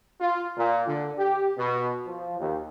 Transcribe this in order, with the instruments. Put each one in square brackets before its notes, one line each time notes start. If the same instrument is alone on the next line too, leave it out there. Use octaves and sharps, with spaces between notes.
[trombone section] F4
A#2
D3
G4
B2
F3
D#2